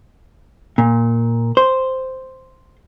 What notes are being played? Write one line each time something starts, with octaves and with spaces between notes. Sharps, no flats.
A#2
C5